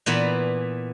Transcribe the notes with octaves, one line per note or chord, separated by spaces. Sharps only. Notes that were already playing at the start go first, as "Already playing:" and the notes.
A#2 E3 B3 E4